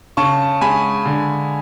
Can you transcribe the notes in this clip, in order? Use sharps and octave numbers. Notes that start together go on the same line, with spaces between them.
C#3 A5 C#6
G#3 G#5 B5
D3